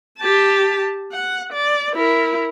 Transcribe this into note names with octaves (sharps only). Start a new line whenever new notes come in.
G4 A5
F#5
D5
E4 A#4